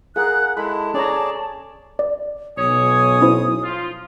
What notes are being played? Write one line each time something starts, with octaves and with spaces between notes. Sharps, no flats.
G#4 A#4 F5 F#5 F#6
G#3 E4 A4 A5 B5
C#4 G#4 C#5 D5 A#5
D5
B1 C#5 G#5 D#6
C#4 E4 C5
F3 F4